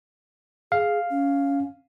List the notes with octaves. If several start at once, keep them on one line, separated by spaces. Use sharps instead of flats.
G#4 F5
C#4